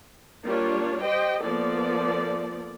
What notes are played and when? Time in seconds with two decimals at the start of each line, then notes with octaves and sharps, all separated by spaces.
0.45 G3 A#3 D4 F4 C#5
1.02 G4 C5 D#5 G5
1.43 F3 A#3 B3 A4 D5